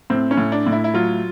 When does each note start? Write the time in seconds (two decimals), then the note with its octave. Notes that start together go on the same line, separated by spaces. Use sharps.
0.10 A2 C4
0.31 C#4
0.37 A2
0.52 D4
0.66 A2
0.72 E4
0.84 E4
0.94 F#3 F4